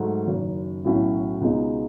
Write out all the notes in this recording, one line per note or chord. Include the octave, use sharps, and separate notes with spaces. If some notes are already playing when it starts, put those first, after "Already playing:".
Already playing: G#2 F#3 A3
F#1 F#2 D#3
B1 A2 F#3 C#4 E4
C#2 B2 G#3 D#4